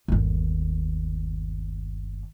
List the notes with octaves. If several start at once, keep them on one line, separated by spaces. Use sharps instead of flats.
G1 D#2